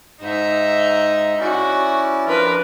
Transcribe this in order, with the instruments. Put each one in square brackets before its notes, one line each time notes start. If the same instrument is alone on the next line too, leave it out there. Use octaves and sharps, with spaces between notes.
[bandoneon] G#2 [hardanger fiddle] D#4 E5
[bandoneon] C#4 E4 D5 [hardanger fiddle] F#4
[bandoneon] F3 D4 F4 [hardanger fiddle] A#4 B4